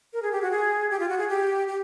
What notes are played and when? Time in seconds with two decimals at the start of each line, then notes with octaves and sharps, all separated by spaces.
0.13 A#4
0.22 G#4
0.32 G4
0.42 F#4
0.51 G#4
0.90 G4
1.00 F4
1.09 F#4
1.18 G#4
1.29 G4
1.67 G4